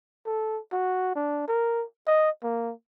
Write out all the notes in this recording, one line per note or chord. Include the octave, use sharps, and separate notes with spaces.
A4
F#4
D4
A#4
D#5
A#3